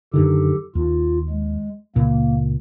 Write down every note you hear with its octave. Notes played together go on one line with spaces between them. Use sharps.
F#2 D3 D#3 G4 A4
D#2 F4
G#3
C#2 A#2 A#3